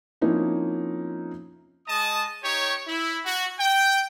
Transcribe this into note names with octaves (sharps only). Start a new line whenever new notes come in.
F3 A#3 C4 C#4 D#4 E4
G#3 D#5 A5 D#6
D#4 G4 C#5
E4
F#4
G5